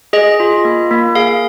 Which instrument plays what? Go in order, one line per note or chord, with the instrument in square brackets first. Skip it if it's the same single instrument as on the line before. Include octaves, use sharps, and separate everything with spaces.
[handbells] G#4 D#5
F4
A#3
A#3
G#4 F5